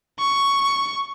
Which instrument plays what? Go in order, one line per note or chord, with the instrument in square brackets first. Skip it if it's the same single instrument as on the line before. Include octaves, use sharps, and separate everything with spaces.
[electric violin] C#6